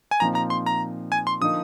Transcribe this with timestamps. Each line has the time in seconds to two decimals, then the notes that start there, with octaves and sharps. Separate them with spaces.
0.11 G#5
0.20 A#2 F3 C4 D#4 A#5
0.35 A#5
0.50 C6
0.66 A#5
1.12 G#5
1.27 C6
1.41 D3 F3 A#3 D#4 D#6